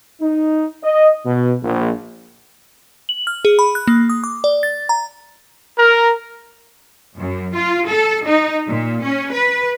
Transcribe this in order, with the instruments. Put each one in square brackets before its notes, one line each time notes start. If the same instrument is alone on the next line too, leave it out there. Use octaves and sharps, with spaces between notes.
[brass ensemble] D#4
D#5
B2
A#1
[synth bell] F#7
F6
G#4
B5
F#6
A#3
D#6
D6
D5
A6
A#5
[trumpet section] A#4
[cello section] F#2
F4
A4
D#4
A#2
C#4
B4